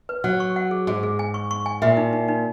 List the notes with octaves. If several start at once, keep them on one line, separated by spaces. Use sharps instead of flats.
B4
F#3 F#5
C#6
F#5
G#4
G#2 G#4
G#4
G#5
C#6
C#6
G#5
A#2 E5
D#4
D#4
D#4